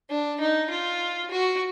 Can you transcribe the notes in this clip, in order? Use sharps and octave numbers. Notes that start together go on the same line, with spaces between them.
D4
D#4
F4
F#4